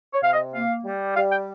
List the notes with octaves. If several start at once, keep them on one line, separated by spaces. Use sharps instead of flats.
C#5
C3 F5
D#5
A#3 F5
G3
G3 F5
G5